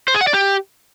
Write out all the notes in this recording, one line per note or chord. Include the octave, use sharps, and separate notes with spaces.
C5
G#4
F#5
D5
G4